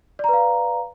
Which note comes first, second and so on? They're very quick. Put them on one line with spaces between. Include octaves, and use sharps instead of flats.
D5 A#5 B4 F5